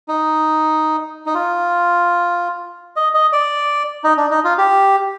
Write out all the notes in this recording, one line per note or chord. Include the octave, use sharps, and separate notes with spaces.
D#4
D#4
F4
D#5
D#5
D5
D#4
D4
D#4
F4
G4